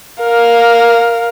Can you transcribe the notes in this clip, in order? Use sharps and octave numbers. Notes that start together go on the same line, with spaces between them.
A#4 F5